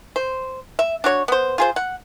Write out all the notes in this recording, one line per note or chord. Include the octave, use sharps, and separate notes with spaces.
C5
E5
D4 F#4 C#5
B3 C5
F4 G#4 C5
F#5